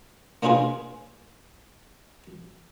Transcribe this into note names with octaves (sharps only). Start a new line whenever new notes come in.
A#3 D4 D#4 F4 G#4 B4